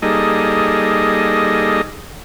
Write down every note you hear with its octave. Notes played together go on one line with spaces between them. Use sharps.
G3 A#3 D#4 G#4 A4 D#5